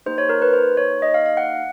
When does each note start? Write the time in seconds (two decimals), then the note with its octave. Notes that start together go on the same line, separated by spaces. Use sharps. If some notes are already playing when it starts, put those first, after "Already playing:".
0.06 A#3 D#4 G4 C5
0.18 C#5
0.29 A#4
0.42 B4
0.53 C5
0.77 C#5
1.02 D#5
1.14 F5
1.26 F5
1.37 F#5